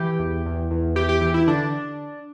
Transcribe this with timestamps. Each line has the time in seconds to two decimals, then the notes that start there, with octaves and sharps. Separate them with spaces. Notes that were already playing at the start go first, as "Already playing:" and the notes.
Already playing: E3 G4
0.19 E2
0.46 E2
0.71 E2
0.96 E3 G4
1.09 G4
1.21 E3 G4
1.34 E4
1.48 D3 D4